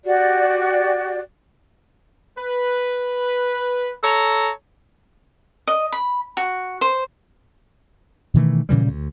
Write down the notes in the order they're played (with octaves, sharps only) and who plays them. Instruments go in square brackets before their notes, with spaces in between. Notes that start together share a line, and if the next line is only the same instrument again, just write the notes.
[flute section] F#4 G4 D5
[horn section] B4
A4 C#5 A#5
[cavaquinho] D#5
B5
F#4
C5
[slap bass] B2 D#3 E3 A3
A#2 C#3 E3 G3
D2